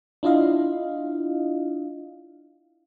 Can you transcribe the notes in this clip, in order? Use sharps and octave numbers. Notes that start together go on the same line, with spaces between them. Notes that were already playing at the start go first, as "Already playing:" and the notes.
D4 E4 F4 D#5 F5